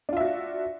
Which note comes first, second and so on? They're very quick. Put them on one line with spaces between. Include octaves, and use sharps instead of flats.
D4 F4 E5 F#4